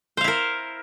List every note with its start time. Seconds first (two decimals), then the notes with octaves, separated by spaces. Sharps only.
0.17 C5
0.21 F5
0.24 E4
0.28 A#4